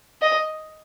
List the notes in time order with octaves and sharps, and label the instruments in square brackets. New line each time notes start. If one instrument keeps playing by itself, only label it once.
[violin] D#5